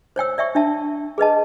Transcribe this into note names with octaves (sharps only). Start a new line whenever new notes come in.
C5 C#5 G5 E6
D5 E5 G5 C#6
D4 E5 A5
G#4 B4 D#5 A5